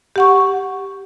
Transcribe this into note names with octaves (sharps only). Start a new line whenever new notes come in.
G4 F#5 C#6